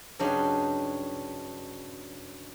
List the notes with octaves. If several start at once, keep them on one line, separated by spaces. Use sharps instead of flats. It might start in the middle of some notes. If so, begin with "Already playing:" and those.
G2 C#3 F#3 D4 D#4